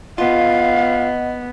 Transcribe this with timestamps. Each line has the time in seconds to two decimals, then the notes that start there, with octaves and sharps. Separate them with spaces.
0.18 B3 F4 D#5 F5 F#5